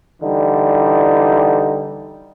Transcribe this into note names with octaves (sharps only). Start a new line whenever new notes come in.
D3 E3 G3 D#4